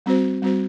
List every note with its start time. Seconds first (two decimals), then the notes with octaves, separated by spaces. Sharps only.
0.06 G3 C4 F#4 C5
0.42 G3 C4 F#4 C5